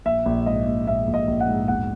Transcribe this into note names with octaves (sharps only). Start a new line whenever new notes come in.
A#1 E5
A#1
G#2 D#5
A#1
A#1 E5
A#1
D#5
A#1
F#5
G#2
E1 F#5